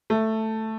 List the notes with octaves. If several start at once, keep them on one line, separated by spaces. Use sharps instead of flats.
A3